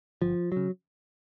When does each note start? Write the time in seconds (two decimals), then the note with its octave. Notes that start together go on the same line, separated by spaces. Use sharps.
0.22 G1 F3
0.52 C#3 F#3